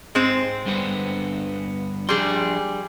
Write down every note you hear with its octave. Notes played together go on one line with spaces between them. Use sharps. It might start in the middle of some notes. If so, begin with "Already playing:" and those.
G#2 G#3 C4 C5
G2 D3 B3
F3 G3 D4 G#4 C6